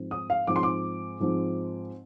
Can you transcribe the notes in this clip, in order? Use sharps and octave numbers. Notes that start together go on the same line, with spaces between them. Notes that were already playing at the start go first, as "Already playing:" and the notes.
Already playing: G#2 F3 C4
D#6
F5
G#2 F3 C4 D6
C6
D6
G#2 F3 C4